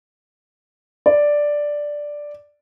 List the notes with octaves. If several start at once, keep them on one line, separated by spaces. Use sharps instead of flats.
D5